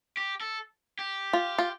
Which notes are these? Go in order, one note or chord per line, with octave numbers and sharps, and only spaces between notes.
G4
A4
G4
F4
F4